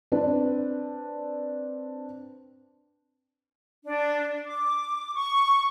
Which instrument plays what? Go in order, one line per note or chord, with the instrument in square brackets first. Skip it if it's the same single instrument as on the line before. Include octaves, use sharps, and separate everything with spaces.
[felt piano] C4 D4 B4
[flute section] D4
D6
C#6